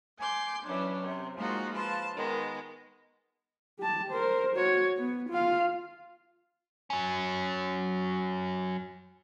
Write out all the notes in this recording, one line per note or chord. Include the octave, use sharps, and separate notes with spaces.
G#5 C6 D6 G6
E3 F#3 C#4 D4
C3
F3 G#3 A#3 D#4 F4 F#4
F3 F4 B4 A5
D#3 G#3 B3
G4 A5
A#4 C5
F#4 C#5
B3
F4 F5
F#3 C#4